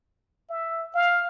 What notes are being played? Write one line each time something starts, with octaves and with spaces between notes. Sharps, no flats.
E5
F5